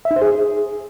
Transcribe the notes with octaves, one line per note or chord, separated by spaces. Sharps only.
E5
D#4
C5
G#4